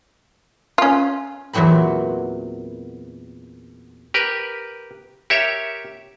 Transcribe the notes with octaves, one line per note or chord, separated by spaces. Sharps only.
C#4 F4
E2 A#2 E3 F#3 C4 B5
G4 A#4 B4
G4 A#4 C#5 E5